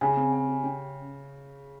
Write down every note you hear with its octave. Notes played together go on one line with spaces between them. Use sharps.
C#3 G#5
C4
G#5
G4
C#4